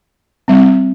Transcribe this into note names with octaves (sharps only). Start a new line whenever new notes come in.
G3 C4